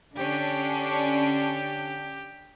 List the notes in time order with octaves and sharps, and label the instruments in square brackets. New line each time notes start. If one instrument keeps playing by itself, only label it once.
[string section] D3 C#4 D4 [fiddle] G4